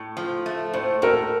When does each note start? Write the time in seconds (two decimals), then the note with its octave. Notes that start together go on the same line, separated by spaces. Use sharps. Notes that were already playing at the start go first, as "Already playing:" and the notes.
Already playing: A2
0.17 F3
0.46 A3
0.74 A2 C5
1.02 A2 A#4